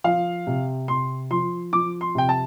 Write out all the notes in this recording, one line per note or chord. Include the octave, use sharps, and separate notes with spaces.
F3 F5
C3
C3 C6
F3 C6
F3 D6
C6
C3 G5
A5